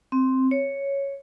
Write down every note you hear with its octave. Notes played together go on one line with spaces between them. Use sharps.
C4
C#5